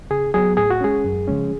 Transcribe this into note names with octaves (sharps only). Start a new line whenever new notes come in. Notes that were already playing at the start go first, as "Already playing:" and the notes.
C#3 G#4
F#3 B3 G#4
A2 G#4
F#4
G#3 C#4 G#4
F#2
C#3 F3 G#3 C#4